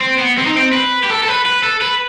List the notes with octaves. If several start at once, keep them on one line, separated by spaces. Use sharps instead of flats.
C4
B3
C4
D#4
C4
B4
G4
A4
A4
B4
B4
A4
B4